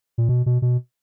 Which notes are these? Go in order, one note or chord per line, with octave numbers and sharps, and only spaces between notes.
A#2
B2
B2
B2